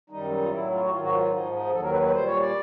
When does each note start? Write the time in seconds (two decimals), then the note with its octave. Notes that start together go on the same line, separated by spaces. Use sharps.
0.10 F#2 D#3 G3 D#4
0.30 D#4
0.42 F4
0.50 A2 F#3 E4
0.71 F4
0.81 F#4
0.90 G#2 D#3 F#3 F4
1.01 F#4
1.11 F4
1.31 G#2 F3 D#4
1.52 D#4
1.66 G#4
1.72 D#2 D#3 F#3 A4
1.82 A#4
1.92 B4
2.02 B4
2.12 A#2 G3 C5
2.26 C#5
2.39 D5